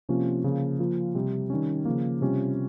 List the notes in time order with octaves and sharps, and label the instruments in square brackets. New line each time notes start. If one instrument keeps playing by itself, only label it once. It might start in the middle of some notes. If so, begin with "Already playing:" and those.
[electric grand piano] C3 F3 A#3 C#4 F4
C#3 F3 A#3
F3 A#3 F4
C3 G3 C4
D#3 G3 C#4
C#3 F3 A#3
C3 G3 C#4 F4